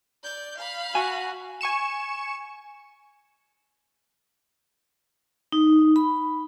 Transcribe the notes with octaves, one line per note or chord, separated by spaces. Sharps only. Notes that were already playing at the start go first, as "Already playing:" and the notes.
D5 G6
F5 B5
F#4 G#5
G#5 C#6 C#7 E7
D#4
B5